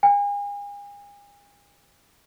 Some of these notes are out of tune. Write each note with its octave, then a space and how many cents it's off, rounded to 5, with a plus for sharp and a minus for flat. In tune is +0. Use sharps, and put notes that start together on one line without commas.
G#5 -40